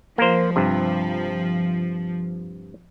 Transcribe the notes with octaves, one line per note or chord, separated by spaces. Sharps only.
F3 A#3 A#4 C5
G2 C3